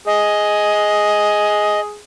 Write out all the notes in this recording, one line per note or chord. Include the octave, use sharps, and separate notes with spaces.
G#4 D#5